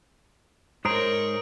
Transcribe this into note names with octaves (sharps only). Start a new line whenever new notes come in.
G#2 A#4 C5 C#5 A#5 D#6 D7